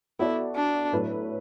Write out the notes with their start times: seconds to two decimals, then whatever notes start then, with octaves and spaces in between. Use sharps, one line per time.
0.19 B3 E4 F#4 A4 D5
0.56 D4
0.92 A2 F#3 A3 E4 B4